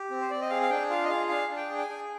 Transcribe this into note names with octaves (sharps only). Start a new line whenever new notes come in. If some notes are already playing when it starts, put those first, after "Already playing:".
Already playing: G4
C4
C5
C4 D5
D#5
G#4 F5
F5
D4 G5
F4 F5
D#5
G#4 F5
D4 F5
D4
G5
G#4
G5
G#5
G#4